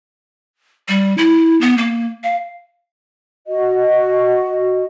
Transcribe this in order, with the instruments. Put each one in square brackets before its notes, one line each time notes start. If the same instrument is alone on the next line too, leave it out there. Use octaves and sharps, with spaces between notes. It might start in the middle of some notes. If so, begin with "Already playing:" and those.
[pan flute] G3
E4
B3
A#3
F5
[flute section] F#4 D#5